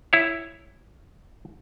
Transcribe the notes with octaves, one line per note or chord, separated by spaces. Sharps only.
E4 C#5